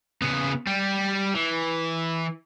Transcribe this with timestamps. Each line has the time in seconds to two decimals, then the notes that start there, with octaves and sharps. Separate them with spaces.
0.22 C#3 B3
0.67 G3
1.34 E3